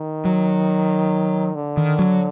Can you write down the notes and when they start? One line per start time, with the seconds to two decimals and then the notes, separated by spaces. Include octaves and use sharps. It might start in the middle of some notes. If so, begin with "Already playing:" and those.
Already playing: D#3
0.25 F#3
1.55 D3
1.77 D#3
1.99 F#3